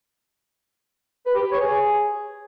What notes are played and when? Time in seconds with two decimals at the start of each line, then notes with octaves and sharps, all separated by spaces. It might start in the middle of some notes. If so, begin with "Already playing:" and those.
1.26 B4
1.35 G4
1.43 B4
1.52 C#5
1.60 G#4